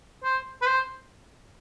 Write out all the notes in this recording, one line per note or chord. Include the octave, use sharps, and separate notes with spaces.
C5
B4
C5